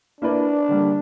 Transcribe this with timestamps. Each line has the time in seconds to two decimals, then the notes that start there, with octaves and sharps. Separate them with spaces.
0.21 A#3 D4 E4 B4 D5
0.69 D3 G3 A#3